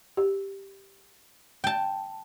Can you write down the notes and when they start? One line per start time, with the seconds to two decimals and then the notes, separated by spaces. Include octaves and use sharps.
0.17 G4
1.64 G5 A5